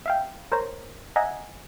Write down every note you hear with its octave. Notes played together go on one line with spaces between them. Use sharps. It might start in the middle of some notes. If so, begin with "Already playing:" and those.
E5 F5 G5
A#4 C5 C#5 A#5
D#5 E5 F#5 G#5 A#5